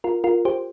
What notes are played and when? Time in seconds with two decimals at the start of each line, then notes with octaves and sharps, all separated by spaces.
0.04 F4 A#4
0.24 F4 A#4
0.45 G4 C5